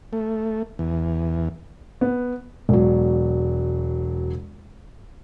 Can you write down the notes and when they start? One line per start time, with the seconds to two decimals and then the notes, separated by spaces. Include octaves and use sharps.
0.13 A3
0.79 E2
2.01 B3
2.69 E1 F#3